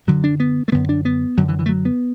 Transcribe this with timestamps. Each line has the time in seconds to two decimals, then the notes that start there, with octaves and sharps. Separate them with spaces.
0.07 F#2 D3 F#3
0.24 D4
0.40 B3
0.68 A3
0.72 F#2 D3 B3
0.89 D4
1.05 B3
1.37 F#2 D3 F#3
1.48 E3
1.59 E3
1.66 A3
1.69 F#3
1.85 B3